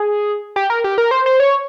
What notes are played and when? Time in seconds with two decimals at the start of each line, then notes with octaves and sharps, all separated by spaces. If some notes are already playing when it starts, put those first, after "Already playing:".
Already playing: G#4
0.56 G4
0.70 A#4
0.84 G4
0.98 A#4
1.11 C5
1.26 C5
1.40 C#5